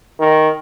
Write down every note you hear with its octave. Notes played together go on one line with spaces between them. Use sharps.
D#3